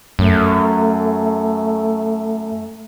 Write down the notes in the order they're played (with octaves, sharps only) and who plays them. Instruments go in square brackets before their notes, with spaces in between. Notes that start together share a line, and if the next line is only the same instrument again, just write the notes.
[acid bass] F#2 [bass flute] A3